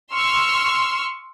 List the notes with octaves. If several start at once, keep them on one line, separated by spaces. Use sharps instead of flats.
C6 C#6 E6 F6